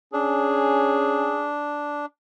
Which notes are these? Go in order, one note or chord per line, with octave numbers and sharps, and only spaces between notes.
C#4 D4 G#4